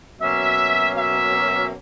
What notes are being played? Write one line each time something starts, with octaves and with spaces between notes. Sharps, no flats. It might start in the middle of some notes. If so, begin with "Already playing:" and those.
B2 F#3 A#3 C#4 E5
E5